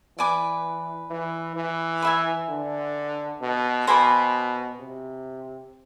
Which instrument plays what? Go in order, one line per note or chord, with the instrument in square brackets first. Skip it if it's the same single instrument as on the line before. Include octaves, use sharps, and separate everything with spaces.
[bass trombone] E3 [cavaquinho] B4 D5 G#5 D6
[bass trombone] E3
E3
[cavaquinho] B4 E5 G#5
[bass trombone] D3
B2
[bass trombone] B2 [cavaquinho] C5 G#5 B5 D6
[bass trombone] C3